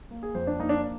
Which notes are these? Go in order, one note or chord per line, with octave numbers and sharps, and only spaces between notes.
A#3
G#4
F2 C5
D4
A#3 D#4
D4